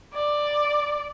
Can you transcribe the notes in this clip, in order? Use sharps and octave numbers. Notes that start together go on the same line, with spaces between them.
D5